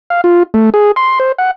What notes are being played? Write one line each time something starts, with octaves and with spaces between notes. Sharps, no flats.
F5
F4
A3
G#4
C6
C5
F#5